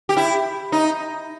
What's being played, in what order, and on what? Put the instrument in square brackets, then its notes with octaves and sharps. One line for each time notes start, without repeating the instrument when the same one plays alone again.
[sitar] G4
E4
D#4